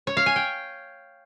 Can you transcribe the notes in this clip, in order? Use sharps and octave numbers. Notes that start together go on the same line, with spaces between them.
C#5
F5
G#5
G5